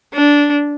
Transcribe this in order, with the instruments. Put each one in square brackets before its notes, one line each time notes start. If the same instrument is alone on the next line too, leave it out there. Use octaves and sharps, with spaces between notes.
[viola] D4